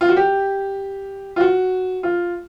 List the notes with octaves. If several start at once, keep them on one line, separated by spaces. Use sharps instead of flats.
F4
F#4
G4
F4
F#4
F4